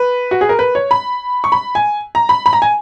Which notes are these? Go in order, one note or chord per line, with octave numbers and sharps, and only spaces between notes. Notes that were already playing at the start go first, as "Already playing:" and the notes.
Already playing: B4
F#4
G#4
A#4
B4
C#5
B5
C#6
B5
G#5
A#5
B5
B5
A#5
G#5